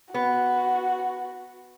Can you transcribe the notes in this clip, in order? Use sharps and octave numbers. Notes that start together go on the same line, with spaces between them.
B3 F#4